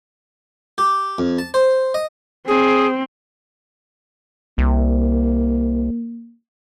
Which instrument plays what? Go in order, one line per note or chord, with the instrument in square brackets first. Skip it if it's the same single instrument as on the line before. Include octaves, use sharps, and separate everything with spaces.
[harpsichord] G4
F2
A5
C5
D#5
[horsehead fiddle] C4 [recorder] G#4
[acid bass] C2 [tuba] A#3